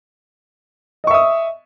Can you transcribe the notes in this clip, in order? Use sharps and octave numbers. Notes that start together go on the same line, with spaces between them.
D#5 E5 C#6 D#6